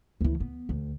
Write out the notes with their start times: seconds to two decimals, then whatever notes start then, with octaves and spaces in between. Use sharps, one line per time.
0.21 D2 E3
0.40 B3
0.69 D2